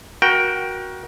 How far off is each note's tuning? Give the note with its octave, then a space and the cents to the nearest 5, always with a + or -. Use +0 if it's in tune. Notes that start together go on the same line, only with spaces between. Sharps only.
F#4 +0 A#4 +25 G5 -5